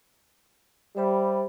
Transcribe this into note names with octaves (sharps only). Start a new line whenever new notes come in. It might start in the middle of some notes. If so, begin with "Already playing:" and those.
G3 C5 E5 B5